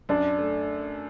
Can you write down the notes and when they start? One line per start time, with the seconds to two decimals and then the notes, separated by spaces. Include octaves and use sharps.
0.09 F#2 D4
0.38 A3